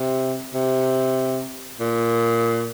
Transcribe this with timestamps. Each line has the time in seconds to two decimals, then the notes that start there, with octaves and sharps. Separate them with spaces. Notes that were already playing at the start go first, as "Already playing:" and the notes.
Already playing: C3
0.54 C3
1.80 A#2